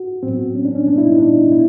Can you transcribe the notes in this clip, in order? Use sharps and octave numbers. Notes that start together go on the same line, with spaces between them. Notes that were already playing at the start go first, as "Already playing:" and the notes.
Already playing: F#4
A2 F#3 B3 C4
C#4
D4
C#4
A#2 G3 B3 D4
E4
D#4
D4
D#4
B2 G#3 B3 E4